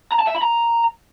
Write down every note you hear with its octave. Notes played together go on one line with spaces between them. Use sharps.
A#5
A5
E5
B5
A#5